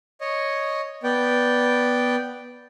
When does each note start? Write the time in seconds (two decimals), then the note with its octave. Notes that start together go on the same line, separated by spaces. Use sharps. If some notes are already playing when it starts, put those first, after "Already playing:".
0.21 C#5 D#5
1.03 B3 D5 G5